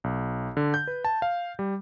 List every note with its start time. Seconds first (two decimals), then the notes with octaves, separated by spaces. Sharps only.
0.04 B1
0.57 D3
0.74 G6
0.87 B4
1.05 A5
1.22 F5
1.59 G3